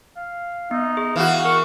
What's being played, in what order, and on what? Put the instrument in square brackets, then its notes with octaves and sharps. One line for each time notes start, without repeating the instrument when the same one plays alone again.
[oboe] F5
[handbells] B3 [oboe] D#4
[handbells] G#4
[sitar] E3 F#4 [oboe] F5
[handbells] A#4 F6 [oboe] C#6